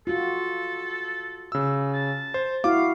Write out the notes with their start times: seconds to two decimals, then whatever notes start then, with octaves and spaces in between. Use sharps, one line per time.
0.07 F4 F#4 A4
1.52 C#3 E6
1.94 A5
2.34 C5
2.64 E4 F#4 F5 D6